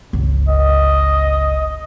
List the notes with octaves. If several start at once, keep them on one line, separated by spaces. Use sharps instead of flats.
G1 C#2
D#5